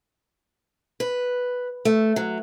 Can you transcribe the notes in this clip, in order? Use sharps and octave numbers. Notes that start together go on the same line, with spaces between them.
B4
A3
F#3